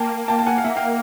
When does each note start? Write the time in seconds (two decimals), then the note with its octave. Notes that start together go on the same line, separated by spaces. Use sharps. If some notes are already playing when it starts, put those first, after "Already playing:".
Already playing: A#3 G5 A5
0.28 G5 A5
0.39 A5
0.47 F#5 G#5
0.58 F5
0.64 A#3 E5 F#5
0.76 F5 G5